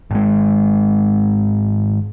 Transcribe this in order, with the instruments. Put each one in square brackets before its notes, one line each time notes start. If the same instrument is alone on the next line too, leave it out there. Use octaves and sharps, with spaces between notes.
[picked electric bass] G#1 G#3